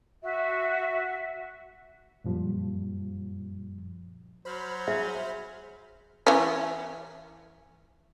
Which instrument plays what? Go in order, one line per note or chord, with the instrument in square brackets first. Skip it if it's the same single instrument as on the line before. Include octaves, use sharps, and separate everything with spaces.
[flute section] F#4 E5
[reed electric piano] F#2 A#2 F3 G3
[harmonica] F#3 [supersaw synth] C5 B5 F6
[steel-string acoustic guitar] G#4 [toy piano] E5
[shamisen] E3 C#4